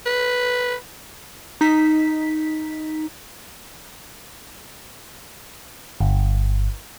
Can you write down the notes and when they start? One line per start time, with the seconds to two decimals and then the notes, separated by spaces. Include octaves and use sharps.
0.06 B4
1.61 D#4 B6
6.01 G1